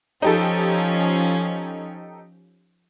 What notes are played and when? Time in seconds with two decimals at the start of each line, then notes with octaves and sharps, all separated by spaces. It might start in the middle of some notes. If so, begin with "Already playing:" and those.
0.22 F3 C#4 D#4 G4 A4